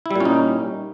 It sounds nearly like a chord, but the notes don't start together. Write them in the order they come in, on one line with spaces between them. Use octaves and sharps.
E4 G3 A#2 C#4 D#4